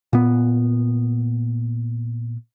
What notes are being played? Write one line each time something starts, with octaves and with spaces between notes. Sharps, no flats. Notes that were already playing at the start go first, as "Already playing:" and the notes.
A#2 B3